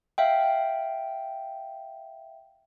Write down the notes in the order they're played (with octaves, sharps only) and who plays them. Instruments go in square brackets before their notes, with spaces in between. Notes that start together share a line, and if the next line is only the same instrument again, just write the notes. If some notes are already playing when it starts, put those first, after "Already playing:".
[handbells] E5 F5 G5